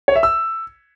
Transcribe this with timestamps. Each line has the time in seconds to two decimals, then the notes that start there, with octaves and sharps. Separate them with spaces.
0.08 C#5
0.16 E5
0.23 E6